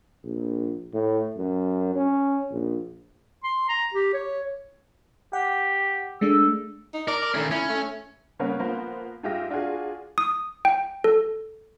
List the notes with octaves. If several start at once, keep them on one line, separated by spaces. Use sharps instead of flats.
A#1
A2
F#2
C#4
A#1
C6
A#5
G4
C#5
G4 F#5
G#3 A3 D4 E6
D#4
A#4 D5
D5
D#3 A3 C#4
C#4 E4
A3
C#3 G3 A#3 B3 C#4
F3 A#3 B3 C5
G#2 G#3 F4 G4 E5 A#6
D4 F4 F#4 G#4
D#6
G5
A4